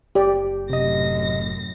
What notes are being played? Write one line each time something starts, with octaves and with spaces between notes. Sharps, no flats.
F#1 G4 D5
F#2 A2 C3 D#5 A#6